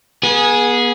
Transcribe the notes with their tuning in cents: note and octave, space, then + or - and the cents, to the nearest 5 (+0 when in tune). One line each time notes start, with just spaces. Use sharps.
B3 -35 G#4 +0